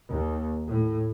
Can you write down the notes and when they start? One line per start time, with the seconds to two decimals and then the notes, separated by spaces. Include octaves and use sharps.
0.11 D#2
0.68 A2